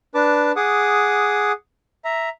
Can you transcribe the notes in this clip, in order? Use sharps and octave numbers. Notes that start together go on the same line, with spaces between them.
D4 B4 A5 D6
G#4 F#5 D6 D#6
E5 A#5